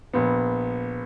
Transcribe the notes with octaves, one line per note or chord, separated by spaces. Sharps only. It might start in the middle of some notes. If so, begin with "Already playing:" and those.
A#1 B3